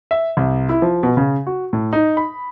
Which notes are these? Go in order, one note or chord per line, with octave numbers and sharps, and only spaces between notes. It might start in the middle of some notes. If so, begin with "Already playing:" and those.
E5
C2
E4
F3
B2
C#3
F#4
A2
D#4
B5